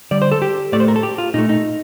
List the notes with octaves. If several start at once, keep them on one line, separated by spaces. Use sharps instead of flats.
D3 G3 D5
C5
A4
G4
A2 A3 D5
C5
A#4
A4
G4
F4
A#2 A3 D#4
D#4